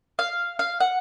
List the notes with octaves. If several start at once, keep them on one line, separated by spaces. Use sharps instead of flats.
F5
F5
F#5